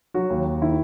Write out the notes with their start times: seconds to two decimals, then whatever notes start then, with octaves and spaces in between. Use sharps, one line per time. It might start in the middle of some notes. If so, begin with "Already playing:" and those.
0.14 F#3 F#4
0.30 D#2
0.46 D#2
0.61 D#3 E4